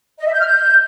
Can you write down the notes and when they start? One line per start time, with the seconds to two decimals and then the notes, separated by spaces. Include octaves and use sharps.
0.19 D#5
0.26 E5
0.33 G6
0.39 F6
0.46 G6